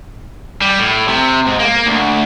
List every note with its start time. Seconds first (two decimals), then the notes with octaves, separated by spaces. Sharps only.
0.62 G3
0.79 A2
1.09 C3
1.47 G#2
1.60 A#3
1.87 D2